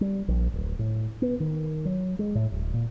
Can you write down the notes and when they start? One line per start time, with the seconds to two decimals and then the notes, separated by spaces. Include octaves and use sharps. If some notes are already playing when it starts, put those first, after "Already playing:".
0.01 G3
0.28 A#1
0.54 D1
0.79 A2
1.22 B3
1.40 D#3
1.85 F#3
2.19 G#3
2.35 A2
2.52 D1
2.74 A#2